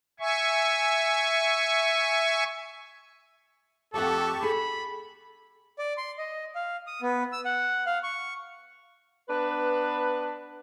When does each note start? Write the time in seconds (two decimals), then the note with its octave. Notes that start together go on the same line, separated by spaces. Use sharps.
0.20 E5 G#5 C#6
3.94 F2 A3 G4 A4 F#5 A5 C#6
4.42 G#4 A4 B5
5.79 D5
5.97 C6
6.18 D#5
6.55 F5
6.87 D#6
7.02 B3
7.32 E6
7.45 F#5
7.86 F5
8.03 C#6
9.29 B3 D4 B4